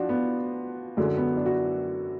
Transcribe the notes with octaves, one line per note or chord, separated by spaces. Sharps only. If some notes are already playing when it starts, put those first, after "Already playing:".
Already playing: F3 D4 F#4
B3
F#2 D3 F#3 G#3
B3
D4
F#4